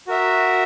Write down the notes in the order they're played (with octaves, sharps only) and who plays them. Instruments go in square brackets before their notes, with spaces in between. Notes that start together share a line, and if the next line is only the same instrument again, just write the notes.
[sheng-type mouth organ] F#4 A#4 E5